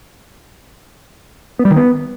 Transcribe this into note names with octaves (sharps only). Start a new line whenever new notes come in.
B3
G3
D#3
B3